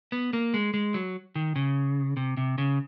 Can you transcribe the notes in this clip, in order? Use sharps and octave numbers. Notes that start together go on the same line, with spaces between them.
B3
A#3
G#3
G#3
F#3
D#3
C#3
C3
C3
C#3